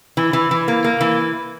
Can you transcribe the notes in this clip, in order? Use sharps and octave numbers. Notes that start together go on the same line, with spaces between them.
E3
E3
E3
A#3
A#3
E3